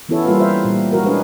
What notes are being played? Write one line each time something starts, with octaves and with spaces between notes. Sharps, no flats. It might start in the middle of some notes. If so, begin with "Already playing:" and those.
E3 B3 C#4 E4 A4 C#5
G3 A#3 F4 A4 B4 F5
F4 C5 E5 F5
A#2 G3
F3 F#4 A#4
G#3 C#4 D4 G#4 B4 F5